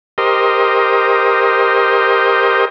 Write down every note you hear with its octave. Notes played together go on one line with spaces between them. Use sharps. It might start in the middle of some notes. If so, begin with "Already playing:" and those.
G4 A#4 C5 D#5